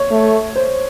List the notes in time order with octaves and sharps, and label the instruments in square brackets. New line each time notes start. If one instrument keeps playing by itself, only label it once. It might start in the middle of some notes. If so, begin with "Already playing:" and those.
Already playing: [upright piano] C#5
[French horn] A3
[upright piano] C5